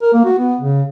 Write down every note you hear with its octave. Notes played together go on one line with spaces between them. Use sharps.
A#4
A#3
F#4
B3
C#3